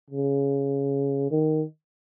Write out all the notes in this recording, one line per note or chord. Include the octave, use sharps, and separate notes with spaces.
C#3
D#3